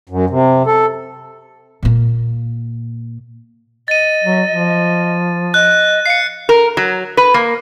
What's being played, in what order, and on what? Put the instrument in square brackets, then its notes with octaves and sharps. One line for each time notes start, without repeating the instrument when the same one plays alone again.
[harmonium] F#2
C3
A4
[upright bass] A#2 A#3
[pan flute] D#5 [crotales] A6 D#7
[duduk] F#3
F3
[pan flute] D#5 [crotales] F#6
[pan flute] F5 [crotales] C7 C#7
[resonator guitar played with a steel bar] A#4
F#3
B4
A#3